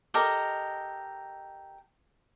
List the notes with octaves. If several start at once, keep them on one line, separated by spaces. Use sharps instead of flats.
G4 A4 A#4 D#5